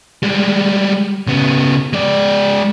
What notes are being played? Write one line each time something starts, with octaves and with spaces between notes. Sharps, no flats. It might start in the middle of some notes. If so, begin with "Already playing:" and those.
G3 G#3
C#3 B3
G#3 D5